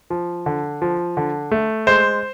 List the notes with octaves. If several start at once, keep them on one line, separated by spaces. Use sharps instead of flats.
F3
D3
F3
D3
A3
G#3 C5